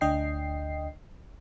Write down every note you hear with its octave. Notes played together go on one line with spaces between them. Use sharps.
D2 D4 D#5 G5 C7